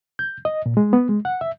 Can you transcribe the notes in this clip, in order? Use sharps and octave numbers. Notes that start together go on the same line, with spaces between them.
G6
D#5
A#2
G#3
B3
G#3
F#5
E5